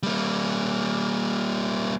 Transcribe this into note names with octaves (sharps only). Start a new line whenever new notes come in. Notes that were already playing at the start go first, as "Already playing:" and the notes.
G3 A#3